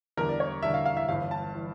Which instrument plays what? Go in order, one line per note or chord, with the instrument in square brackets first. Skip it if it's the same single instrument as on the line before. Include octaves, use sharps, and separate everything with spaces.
[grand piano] E2 D3 G3 D4 A#4
D5
C#5
E2 D3 G3 D4 E5
F5
F5
E5
G1 G2 E3 F5
A5
E3